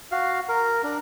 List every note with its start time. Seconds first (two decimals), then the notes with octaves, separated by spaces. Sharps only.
0.12 F#4 F5
0.49 A#4
0.84 D4 A#4